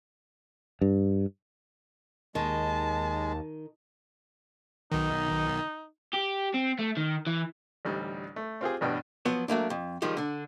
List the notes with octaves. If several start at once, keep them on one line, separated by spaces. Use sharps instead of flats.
G2
D#2 D#3 G#3 A5
B1 D#3 D#4
G4
C4
A3
D#3
E3
A1 D2 G3 D#4
A3
C4 F4 G4 G#4
A1 G2 B2 D4 G5
F3 F#3 B3
F#3 A3 A#3 D4
F2
D#3 F3 G3 G#3
D3 D4